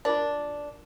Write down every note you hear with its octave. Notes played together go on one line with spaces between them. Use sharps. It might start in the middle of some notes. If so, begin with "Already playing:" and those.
D4 F4 G#4 A#4